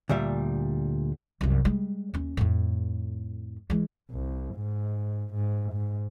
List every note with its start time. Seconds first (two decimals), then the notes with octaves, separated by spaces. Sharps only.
0.09 D2 A#2 G3 E5
1.41 C2 F#2
1.65 G3 G#3
2.14 D#2 C#4
2.37 F2 A2
3.70 E3 G#3
4.11 C2
4.55 G#2
5.34 G#2
5.72 G#2